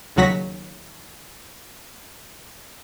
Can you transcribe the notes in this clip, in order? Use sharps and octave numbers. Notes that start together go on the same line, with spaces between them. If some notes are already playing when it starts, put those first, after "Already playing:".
D#2 C#3 F#3 F#4 A#6 B6